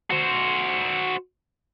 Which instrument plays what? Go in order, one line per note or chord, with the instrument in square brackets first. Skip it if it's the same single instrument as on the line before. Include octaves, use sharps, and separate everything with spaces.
[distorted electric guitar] F#4 C5